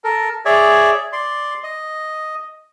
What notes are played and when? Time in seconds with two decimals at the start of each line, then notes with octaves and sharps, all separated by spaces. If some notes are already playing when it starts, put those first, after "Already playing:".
0.04 A4 A#4
0.45 G#4 C#5 D5 E5
1.13 D5 C6
1.63 D#5